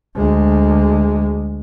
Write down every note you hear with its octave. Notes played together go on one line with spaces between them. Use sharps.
D2 G#3